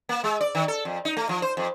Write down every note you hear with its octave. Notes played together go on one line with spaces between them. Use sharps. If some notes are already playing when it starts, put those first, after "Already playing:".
A#3
G#3
D5
D#3
A4
F2
D#4
A3
F3
C5
F2